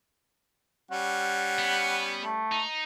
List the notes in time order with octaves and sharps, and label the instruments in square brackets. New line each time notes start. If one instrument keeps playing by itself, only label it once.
[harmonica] G3 C#4 [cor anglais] F#5
[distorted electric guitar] B3
[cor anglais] A3
[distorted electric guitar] D#4